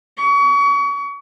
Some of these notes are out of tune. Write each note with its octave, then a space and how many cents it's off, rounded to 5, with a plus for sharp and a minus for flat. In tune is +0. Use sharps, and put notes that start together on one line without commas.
C#6 +35